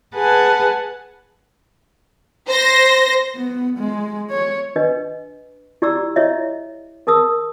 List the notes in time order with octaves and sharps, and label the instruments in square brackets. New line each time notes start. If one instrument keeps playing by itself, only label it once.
[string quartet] G#4 B4 F#5 G#5 A5
[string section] C5 A#6
[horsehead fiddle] B3
G#3
C#5
[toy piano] D4 B4 D#5
E4 G4 D5 A#5 D6 E6
E4 C#5 D#5 E5
G#4 A#4 A5 D#6 E6